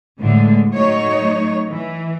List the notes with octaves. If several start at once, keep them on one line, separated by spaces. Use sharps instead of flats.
A2 D3 E3 G#3 A3
F#3 A3 D#4 C#5
E3